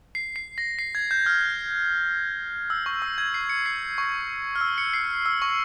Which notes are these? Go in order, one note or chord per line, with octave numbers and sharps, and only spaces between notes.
C7
C7
A#6
C7
G#6
G6
F6
E6
C#6
E6
G#6
C7
C#7
C7
C#6
F6
E6
C#7
C7
E6
C#6